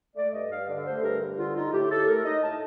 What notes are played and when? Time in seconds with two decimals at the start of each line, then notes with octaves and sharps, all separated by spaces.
0.16 A3 D5
0.33 G2 D#5
0.51 G2 F5
0.68 D3 D5
0.86 A3 C5
1.03 G2 A#4
1.21 G2
1.38 D3 F4
1.55 D#4 F4
1.72 A2 G4
1.91 A2 A4
2.07 A3 A#4
2.25 D#4 D#5
2.42 A2 A5